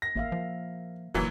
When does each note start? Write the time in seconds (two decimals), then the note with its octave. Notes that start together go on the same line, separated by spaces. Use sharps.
0.02 A#6
0.16 A1 A#3 E5 F5
0.32 F3
1.14 F#1 A#2 E3 F#3